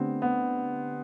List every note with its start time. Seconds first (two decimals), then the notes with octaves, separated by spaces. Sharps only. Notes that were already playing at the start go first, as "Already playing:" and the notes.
Already playing: D3 A3 B3 C4 D4 G4
0.22 B3